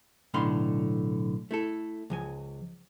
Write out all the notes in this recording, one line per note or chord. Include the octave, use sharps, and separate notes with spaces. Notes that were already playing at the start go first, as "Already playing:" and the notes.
B1 A2 D3 F5 B5 C6
A3 E4 A4
C#2 F3 G#5